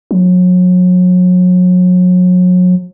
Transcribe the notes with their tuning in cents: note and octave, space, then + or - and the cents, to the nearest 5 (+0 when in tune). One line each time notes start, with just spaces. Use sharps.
F#3 -35